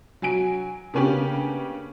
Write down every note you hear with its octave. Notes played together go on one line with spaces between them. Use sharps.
F#3 G#5 D7
C#3 A#3 B3 C#4 D4 G4